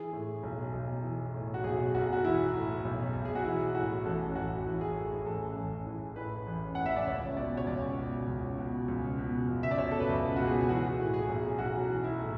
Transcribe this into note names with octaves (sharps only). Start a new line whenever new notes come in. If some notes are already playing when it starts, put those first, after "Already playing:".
Already playing: E3 G#4
A2
B1
B1
E3
A2
F#4
B1 G#4
B1 F#4
F#4
E3 E4
A2
B1
B1
G#4
F#4
E3 E4
A2 F#4
A1 A4
A1 F#4
E3
G#4
A2
A1 A4
A1
E3
A2 B4
A1
A1 F#5
E5
D5
C#2 C#5
B2 D5
C#5
C#2 D5
B2
C#2
B2
C#2
B2
C#2
E5
D5
B2 C#5
A4
B4
C#2
B2 F#4
G#4
G#4
E3 F#4
A2
G#4
B1
B1 F#4
E3
E4
A2